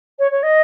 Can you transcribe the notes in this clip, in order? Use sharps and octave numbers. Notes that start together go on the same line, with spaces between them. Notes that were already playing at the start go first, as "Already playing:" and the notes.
C#5
C#5
D#5